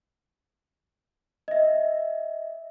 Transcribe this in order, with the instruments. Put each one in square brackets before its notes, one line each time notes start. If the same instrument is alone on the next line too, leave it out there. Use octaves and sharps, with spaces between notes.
[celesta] D#5 E5